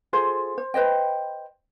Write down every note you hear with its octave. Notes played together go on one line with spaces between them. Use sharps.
F4 G#4 A4 C5
C5
B4 C5 D#5 G5